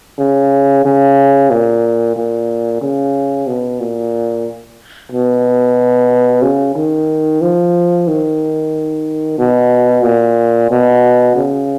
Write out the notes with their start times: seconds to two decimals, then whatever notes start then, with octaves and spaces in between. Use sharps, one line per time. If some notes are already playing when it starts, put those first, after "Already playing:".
0.18 C#3
0.85 C#3
1.51 A#2
2.16 A#2
2.81 C#3
3.47 B2
3.80 A#2
5.12 B2
6.42 C#3
6.75 D#3
7.42 F3
8.08 D#3
9.38 B2
10.04 A#2
10.71 B2
11.36 C#3